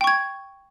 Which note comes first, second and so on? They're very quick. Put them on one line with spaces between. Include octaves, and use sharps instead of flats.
G5 C#6 G#6